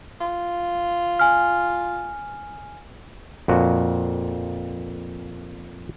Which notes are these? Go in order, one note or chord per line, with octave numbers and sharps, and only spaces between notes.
F4
G#5 F6
F2 A#2 F#4